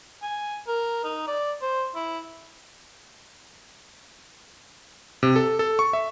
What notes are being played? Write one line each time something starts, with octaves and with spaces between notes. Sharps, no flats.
G#5
A#4
D#4
D5
C5
E4
C3
A4
A4
C#6
E5